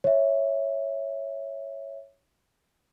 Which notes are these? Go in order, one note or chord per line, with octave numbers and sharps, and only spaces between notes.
C#5 E5